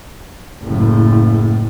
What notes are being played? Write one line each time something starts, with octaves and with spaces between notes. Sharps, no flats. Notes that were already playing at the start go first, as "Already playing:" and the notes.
F#1 A2